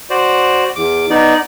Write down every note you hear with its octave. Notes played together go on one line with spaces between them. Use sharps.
F#4 C5 D5
E2 D6
B3 D#4 D5